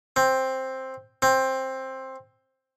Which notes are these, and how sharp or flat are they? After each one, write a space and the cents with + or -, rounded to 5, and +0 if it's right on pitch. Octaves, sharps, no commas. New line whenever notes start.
C4 +10
C4 +15